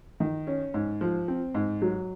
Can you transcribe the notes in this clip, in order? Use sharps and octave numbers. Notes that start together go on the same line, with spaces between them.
D#3
C#4
G#2
F3
C4
G#2
F#3